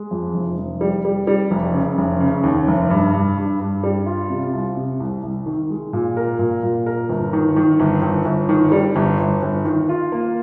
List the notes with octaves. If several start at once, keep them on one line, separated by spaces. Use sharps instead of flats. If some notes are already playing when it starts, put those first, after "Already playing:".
Already playing: G#3
F2
F1
F1
G3
G3
G3
F1
C#3
F1
C#3
D#2
F1
G2
G2
G2
G2
G3
F4
C3
C2
C3
C2
C2
D#3
G#3
A#2
A#4
A#2
A#2
A#4
G1
D#3
D#3
G1
G1
G1
D#3
G3
G1
G1
G1
D#3
F4
A#3